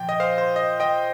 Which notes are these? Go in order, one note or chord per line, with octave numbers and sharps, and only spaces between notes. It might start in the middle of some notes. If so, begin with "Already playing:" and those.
Already playing: A#2 F3 G5
D#5
C5 F5
C5
D#5
D#5 G5